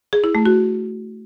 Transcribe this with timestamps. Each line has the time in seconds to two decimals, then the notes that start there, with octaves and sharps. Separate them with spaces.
0.13 G#4
0.24 E4
0.35 A3
0.46 F#4